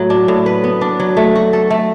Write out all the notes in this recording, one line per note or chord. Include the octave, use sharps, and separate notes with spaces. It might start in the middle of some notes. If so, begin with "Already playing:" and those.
Already playing: A2 F#3
D4
A2
B4
B3
D4
F#3
A3
F#4
A4
A3